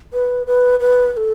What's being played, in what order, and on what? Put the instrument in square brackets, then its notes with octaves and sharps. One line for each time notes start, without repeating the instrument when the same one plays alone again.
[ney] B4
B4
B4
B4
A4